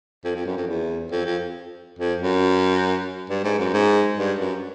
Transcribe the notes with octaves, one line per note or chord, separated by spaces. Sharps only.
F2
F2
F#2
F2
E2
F2
F2
F2
F#2
G2
G#2
F#2
G#2
G2
F#2